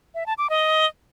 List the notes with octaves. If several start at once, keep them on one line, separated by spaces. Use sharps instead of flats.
E5
A5
D6
D#5